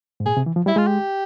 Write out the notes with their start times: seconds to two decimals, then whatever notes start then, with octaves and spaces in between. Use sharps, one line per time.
0.20 G#2
0.26 A#2 G#4
0.37 C3
0.46 E3
0.56 F3
0.66 G3 E4
0.76 G#3 F4
0.87 G4